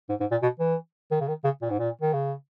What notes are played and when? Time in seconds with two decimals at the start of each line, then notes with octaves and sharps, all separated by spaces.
0.09 G#2
0.20 G#2
0.31 A#2
0.42 B2
0.60 E3
1.11 D#3
1.21 C#3
1.28 D#3
1.44 C#3
1.62 A#2
1.70 G#2
1.79 A#2
2.01 D#3
2.13 C#3